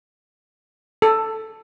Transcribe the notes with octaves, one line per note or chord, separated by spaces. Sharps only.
A4